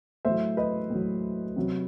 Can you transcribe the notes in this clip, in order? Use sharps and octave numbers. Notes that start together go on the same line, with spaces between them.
A2 F#3 C5 E5
B4 D#5
A2 F#3
C3 F#3